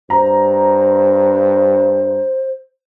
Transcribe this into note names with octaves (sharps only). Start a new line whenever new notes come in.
G2 C5 A#5